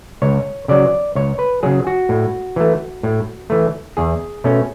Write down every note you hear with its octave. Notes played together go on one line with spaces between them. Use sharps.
C#2 C#5
C#3 F#3 D5
C#2 C#5
B4
C#3 F#3 G#4
F#4
A2
E3 A3
A2
E3 A3
E2 G#4
B2 A3 C#4